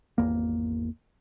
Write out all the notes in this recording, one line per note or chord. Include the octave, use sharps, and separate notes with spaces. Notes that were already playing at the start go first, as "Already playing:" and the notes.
G#1 E2 A#3